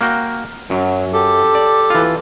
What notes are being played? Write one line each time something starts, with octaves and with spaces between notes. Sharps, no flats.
A#3 F#4 G5
F#2 F#3
G4 A4
D5
E3 F4